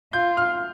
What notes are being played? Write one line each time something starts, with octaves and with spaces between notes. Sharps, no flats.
F4 G6
F6